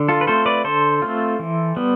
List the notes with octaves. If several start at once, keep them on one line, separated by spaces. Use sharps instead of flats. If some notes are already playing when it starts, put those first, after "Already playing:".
Already playing: D3
F4 A4
B4
A3 C4 F4 A4 C5
B4 D5
D3 A4 C5
A3 C4 F4
E3
G3 B3